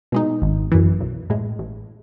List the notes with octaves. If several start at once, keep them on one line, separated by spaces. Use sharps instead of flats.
B2 G#3 D#4
G#1
F#2 E3
B1
A2 G#3
A1